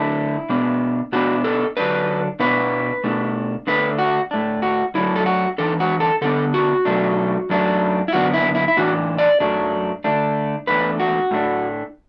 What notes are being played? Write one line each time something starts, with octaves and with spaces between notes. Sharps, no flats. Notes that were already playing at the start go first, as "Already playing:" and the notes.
Already playing: D3 A3 D4 E4
B2 B3 D4
B2 B3 D4 F#4
A4
D3 F#3 D4 B4
B2 B3 D4 B4
B2 A3 D4
D3 A3 D4 B4
F#4
A2 A3 D4
F#4
F#2 F#3 A3 D4 E4
A4
F#4
E2 E3 D4 A4
F#4
A4
D3 B3 D4 A4
F#4
B2 F#3 A3 D4
F#2 F#3 A3 D4
E4
F#2 D3 B3 D4 F#4
E4
E4
E4
A2 E3 D4 F#4
D5
F#2 F#3 A3 D4
D3 A3 D4
E2 B2 A3 D4 B4
F#4
A2 A3 D4